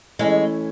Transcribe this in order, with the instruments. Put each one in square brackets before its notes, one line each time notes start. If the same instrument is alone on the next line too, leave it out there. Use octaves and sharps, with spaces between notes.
[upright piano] E3 A3 C#4 E4 [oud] G#3